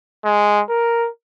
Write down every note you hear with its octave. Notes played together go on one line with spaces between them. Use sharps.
G#3
A#4